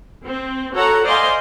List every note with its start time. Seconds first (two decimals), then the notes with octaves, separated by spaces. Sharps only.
0.24 C4
0.74 F#4 A4 C#5 F#5 A#5
1.04 C5 D5 D#5 F5 G#5 C6